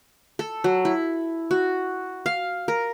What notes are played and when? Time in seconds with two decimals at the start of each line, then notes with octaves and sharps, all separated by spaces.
0.39 A4
0.64 F#3
0.85 E4
1.51 F#4
2.26 F5
2.68 A#4